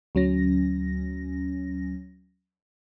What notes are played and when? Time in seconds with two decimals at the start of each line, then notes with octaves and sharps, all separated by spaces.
0.15 D2 F#3 C#4 A#6